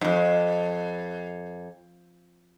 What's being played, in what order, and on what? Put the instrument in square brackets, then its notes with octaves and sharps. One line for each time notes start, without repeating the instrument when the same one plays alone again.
[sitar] F2 G#2